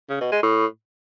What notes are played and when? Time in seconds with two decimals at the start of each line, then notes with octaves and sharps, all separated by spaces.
0.09 C#3
0.21 B2
0.32 G#3
0.43 A2